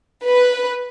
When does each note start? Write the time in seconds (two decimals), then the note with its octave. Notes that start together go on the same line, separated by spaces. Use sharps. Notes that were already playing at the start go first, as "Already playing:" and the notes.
0.25 B4